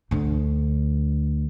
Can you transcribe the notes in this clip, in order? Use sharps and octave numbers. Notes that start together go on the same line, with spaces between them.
D2 D3